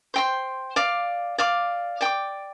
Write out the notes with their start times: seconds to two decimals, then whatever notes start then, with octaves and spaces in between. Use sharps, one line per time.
0.14 C5 G5 C6
0.76 D5 F5 D6
1.38 D5 F5 D6
2.01 D5 G5 D6